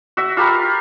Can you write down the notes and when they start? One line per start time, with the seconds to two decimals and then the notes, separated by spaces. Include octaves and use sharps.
0.17 F#4 E5
0.37 F4 G4 A#4 B4